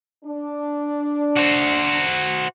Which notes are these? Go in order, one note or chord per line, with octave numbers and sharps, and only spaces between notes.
D4
F#4 C5